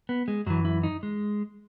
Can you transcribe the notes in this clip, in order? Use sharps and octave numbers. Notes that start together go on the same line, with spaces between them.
B3
G#3
F#2 E3 F#3
E4
D#4
G#3